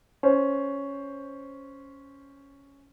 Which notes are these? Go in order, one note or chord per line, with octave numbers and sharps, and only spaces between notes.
C#4 C5